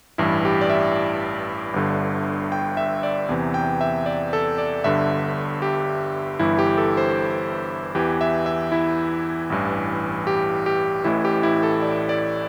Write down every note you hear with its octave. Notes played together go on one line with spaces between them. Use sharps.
A1 G2 E3 E4
G4
D5
E5
G1 G2 D3
G5
E5
D5
E2 C3 E3
G5
E5
D5
A4
D5
G1 G2 D3 E5
G4
G1 G2 E3 E4
G4
A4
C5
E2 E3 G4
E5
E5
E4
A1 G2 E3
G4
G4
A1 A2 E3 E4
G4
E4
A4
D5
D5